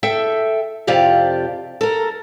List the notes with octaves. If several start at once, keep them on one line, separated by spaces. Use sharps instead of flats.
A4 E5 G5
F2 C3 F4 G4 D5
A4 A#4